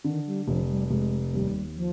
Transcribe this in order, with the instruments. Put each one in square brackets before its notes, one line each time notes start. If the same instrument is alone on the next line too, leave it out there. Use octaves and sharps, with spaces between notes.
[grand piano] D3 [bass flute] D#3
[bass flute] G3
[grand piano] F1 [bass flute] F3
[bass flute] G3
[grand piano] F1 [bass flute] G#3
[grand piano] D#2 [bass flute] G3
[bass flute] F3